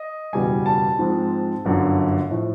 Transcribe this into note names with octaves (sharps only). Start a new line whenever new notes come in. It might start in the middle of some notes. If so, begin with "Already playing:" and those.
Already playing: D#5
F#1 E2 B2 G3 G#5
A5
G#2 F3 G#3 C4
G1 F#2 D3
A2 F3